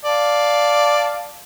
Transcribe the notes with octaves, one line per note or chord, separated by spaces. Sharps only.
D5 F5 A5